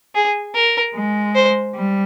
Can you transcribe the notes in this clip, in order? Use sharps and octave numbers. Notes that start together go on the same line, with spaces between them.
G#4
A#4
G#3
C5
G3